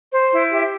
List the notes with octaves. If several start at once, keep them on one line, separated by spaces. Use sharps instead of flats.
C5
E4
G4 E5